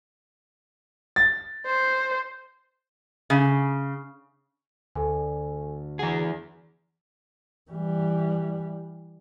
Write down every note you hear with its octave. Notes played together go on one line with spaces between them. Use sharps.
A6
C5
C#3
D2 A4 G#5
E3 G#4 F#5 A#5
E3 G3